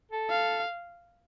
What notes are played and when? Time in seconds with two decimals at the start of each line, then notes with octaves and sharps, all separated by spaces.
0.12 A4
0.30 F5